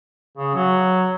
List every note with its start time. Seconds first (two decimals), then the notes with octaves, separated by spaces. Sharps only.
0.37 C#3
0.54 F#3